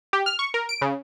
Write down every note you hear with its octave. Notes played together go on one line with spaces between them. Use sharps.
G4
F6
C#6
A#4
D7
C#3